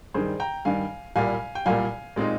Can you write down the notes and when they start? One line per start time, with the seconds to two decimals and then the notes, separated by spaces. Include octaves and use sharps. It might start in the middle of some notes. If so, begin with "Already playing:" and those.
0.14 G2 D#3 G3 G#4 C5
0.40 G5 A#5
0.65 G2 D#3 G3 F5 G#5
1.16 C2 A#2 G3 A#3 F5 G#5
1.55 G5
1.66 C2 A#2 G3 A#3 F5 G#5
2.16 A#2 G#3 C4 D#4